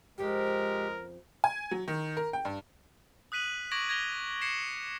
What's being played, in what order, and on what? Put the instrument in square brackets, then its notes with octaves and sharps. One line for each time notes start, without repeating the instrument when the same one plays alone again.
[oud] F2 C#3 F3 [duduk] G#3 [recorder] G4 [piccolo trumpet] A#4
[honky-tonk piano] G#5
F#3
D#3
A#4
G5
G2
[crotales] D#6 F#6 B6 D#7 F#7
C#6 D6 G#6 A#6 D7 F#7
G#6 A#6 F7 G7
G#6 A#6 C7 C#7 E7 F#7